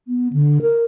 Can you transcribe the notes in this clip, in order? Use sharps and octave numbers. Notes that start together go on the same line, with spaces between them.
B3
D3
A#4